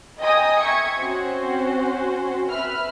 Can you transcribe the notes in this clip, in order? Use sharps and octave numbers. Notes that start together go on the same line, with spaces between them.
D#5 G5 G#5 A#5 D#6
E5 C#6 G#6 C#7
C4 C#4 F#4 C5
B4 E5 B5 F6